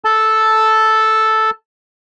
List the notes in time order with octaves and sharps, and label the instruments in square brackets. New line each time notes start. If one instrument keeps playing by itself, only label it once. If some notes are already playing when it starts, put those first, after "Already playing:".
[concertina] A4 A5